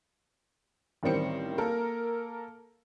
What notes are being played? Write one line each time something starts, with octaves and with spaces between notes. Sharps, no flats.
A1 D#3 G3 C4 C#7
A#3 A4 A#4